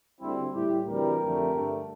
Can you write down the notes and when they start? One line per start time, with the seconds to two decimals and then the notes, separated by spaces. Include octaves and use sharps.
0.20 D2 D3 G3 C4 E4
0.53 A2 G3 E4 G4
0.86 D2 C3 E3 G3 G4 A#4
1.20 F2 D3 A3
1.52 G2 D3 A3